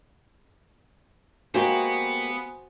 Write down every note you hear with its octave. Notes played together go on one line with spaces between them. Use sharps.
G#3 A#3 B3 F#4 G4 C5 G#5